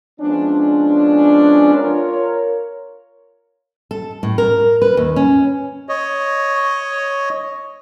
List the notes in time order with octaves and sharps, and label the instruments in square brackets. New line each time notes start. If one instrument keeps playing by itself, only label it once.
[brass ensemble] F3 G#3 B3 C#4 D4
F4 A#4 C#5
[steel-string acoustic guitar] A4
A2
A#4
B4
D#2
C#4
[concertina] C#5 D#5